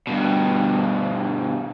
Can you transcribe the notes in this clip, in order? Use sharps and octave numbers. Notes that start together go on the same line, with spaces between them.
G2 B2